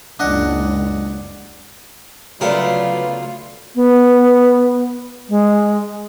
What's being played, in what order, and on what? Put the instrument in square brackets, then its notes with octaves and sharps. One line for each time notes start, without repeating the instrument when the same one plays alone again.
[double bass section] F#1 C#2 [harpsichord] D4 D#5 F#5
[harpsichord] D2 C#3 A#4 [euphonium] F#3 [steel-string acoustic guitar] B3 B4 D5 [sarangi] F4
[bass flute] B3
G#3